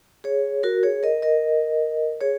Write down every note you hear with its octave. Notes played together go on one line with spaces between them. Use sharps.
G#4 C#5
F#4 A#4
G#4 C#5
A#4 D#5
A#4 D#5
G#4 C#5